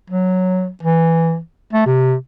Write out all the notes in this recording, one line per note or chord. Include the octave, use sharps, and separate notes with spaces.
F#3
E3
A3
C3